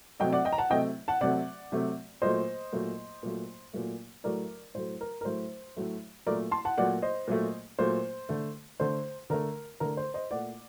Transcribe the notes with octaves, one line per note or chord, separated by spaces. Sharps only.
C3 F#3 A3 D#5 G5
D5 F#5
D#5 G5
A#5
F#5 A5
C3 F#3 A3 D#5 G5
F#5 A5
C3 F#3 A3 D5 F#5
C3 F#3 A3
A#2 F#3 A3 C5 D#5
A#2 F#3 A3
A#2 F#3 A3
A#2 F#3 A3
A2 F#3 A3 A#4 D5
A2 F#3 A3 C5
A#4
A#4
A2 F#3 A3 C5
A2 F#3 A3
A#2 F#3 A3 A#4 D5
A5 C6
F#5 A5
A#2 F#3 A3 D5 F#5
C5 D#5
A#2 F#3 A3
A#2 F#3 A3 C5
D3 A3
D3 A3 C5
D3 A3 A#4
D3 A3 A#4
C5
C5 D#5
A#2 A3 D5 F#5